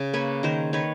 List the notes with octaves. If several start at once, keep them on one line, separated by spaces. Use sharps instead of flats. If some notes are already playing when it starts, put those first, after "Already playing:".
Already playing: C#3
A#3 B4 C#5
D#3 A#4 C5
D#3 B4 C#5